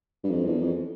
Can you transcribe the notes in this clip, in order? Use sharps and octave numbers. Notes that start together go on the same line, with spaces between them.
G2
F2
E2
F2